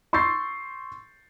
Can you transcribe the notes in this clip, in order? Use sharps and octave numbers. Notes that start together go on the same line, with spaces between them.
C6 C#6 E6 G6 A6 C7